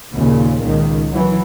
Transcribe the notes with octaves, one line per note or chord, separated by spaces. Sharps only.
D#2 A#2 C#3
C#2 D#3
E3 F#3